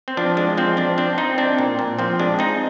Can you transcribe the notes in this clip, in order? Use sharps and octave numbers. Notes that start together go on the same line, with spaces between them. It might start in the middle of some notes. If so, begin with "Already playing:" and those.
C4
F3 D4
G#3 D4
F3 C4
F3 D4
C4 D4
C4 D#4
C4 D4
A#2
A#2
F3 C4
G#3 D4
C4 D#4